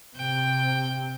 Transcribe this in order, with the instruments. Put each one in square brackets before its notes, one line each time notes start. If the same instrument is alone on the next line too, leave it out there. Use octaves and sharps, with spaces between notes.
[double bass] C3 [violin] G5